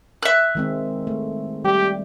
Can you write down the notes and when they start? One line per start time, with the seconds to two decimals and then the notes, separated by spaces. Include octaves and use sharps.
0.23 E5 F#6
0.55 D#3 G#3 C4
1.07 A3
1.64 G3 G4